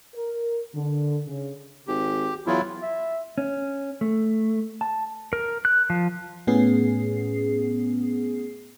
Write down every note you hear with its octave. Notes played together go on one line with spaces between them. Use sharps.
A#4
D3
C#3
G#1 G4
E2 F#3 E4 F4
E5
C#4
A3
A5
A#4
F#6
F3
A2 B3 C#4 G#4 C7